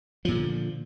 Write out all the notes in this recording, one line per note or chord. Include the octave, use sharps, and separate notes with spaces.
A#2 D3 D#3 F3